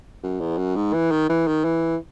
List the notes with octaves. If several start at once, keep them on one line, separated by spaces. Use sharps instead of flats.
F#2
E2
F#2
G#2
E3
D#3
E3
D#3
E3